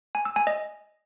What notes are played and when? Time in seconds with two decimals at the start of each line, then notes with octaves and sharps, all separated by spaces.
0.15 G#5
0.25 E6
0.36 G#5
0.47 D#5